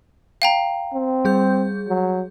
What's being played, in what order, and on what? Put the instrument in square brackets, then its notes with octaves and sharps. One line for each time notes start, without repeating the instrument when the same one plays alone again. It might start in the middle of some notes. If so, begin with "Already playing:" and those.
[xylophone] F5 G5 A#5
[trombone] C4
[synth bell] G3 G#4 G6
[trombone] F#3